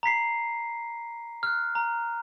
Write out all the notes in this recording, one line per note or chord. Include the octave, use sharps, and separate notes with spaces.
A#5 B5 B6 C7
F6 F#6
A#5